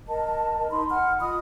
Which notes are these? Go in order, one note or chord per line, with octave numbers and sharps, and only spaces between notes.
A#4 D#5 A5
D#4 B5 C6
F#5 F6
F4 D#5 B5 D#6